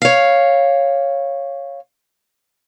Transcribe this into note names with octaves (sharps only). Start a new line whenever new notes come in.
C#5 F5